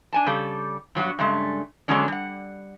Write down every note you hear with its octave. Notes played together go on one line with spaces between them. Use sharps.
D4 G#5 A5
C#3 G3 G4 A4
G2 F#3 B3 F#4
G2 C#3 G#3 A3
D3 F#3 G#3 B3 C#4 D4
G3 F#5